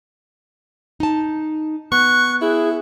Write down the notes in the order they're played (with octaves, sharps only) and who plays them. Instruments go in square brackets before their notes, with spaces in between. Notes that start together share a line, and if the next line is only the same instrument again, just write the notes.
[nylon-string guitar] D#4 A5
[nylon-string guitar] B3 [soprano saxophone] C#6 [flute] F#6
[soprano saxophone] E4 [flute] G#4